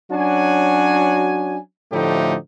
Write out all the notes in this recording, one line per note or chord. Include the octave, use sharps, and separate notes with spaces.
F#3 C#4 D4 F#4 G#5
A2 D3 F3 A3 D#4 G4